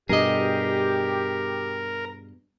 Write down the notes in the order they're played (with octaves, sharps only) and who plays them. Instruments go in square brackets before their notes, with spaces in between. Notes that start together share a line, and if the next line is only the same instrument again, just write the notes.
[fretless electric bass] G2 B2 [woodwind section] G4 [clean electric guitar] G#4 D#5 [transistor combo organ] A#4